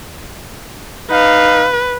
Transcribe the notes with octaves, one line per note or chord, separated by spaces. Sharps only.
D#4 B4 F5